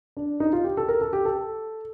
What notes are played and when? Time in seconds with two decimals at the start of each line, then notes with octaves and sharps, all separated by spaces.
0.17 D4
0.40 D#4
0.53 F4
0.64 G4
0.77 A4
0.88 A#4
1.01 A4
1.13 G4
1.25 A4